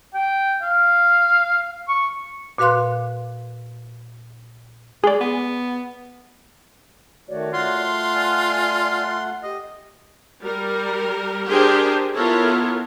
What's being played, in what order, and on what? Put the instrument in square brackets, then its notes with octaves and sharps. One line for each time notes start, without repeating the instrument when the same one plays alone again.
[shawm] G5
F5
C#6
[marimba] A#2 F#4 B4 F5 C6 F#6
[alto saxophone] G#3 [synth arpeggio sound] G#4 D5
[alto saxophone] B3
[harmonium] D#3 A3 [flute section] F#4 C#5 D5
[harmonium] A3 F#5 [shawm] F4 [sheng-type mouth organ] C6
[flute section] D5 G#5
[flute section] G4 [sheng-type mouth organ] D#5
[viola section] G3 A#4
D4 G4 G#4 A#4 C5 G5
B3 E4 F4 A4 A#4 C#5